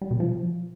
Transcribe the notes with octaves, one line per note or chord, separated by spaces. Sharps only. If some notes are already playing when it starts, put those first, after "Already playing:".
G3
B2
F3